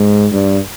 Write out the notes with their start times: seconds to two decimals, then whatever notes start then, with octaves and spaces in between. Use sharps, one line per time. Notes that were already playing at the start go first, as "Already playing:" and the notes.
Already playing: G#2
0.33 G2